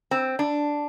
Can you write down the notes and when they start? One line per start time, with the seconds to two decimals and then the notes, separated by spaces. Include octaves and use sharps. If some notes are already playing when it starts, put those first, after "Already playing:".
0.11 C4
0.39 D4